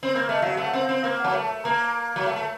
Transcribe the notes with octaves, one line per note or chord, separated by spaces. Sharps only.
C4
A#3
A3 D#5
F#3 F5
A3 F5
F#5
C4
F5
C4
A#3 F5
F#5
F#3 A5
A3
A5
A#3 A#5
F#3
A3
A3